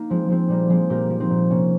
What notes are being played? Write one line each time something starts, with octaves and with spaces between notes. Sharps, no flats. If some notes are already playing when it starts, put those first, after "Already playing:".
Already playing: A#3 D#4
F3 G#3 C4
F3 G#3 C4
A#2 G3 A#3
F3 G#3 C4
A#2 G4 A#4
F3
C4 D#4
A#2
C3 A#3 C#4